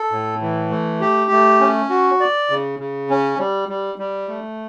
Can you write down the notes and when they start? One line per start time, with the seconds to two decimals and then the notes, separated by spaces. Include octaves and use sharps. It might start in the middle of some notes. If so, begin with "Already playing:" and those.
Already playing: A4
0.11 A2
0.41 E3
0.71 A3
1.01 G4
1.31 A3
1.60 C#4
1.90 F#4
2.20 D5
2.50 C#3
2.79 C#3
3.10 C#4
3.39 G3
3.69 G3
3.98 G3
4.28 A3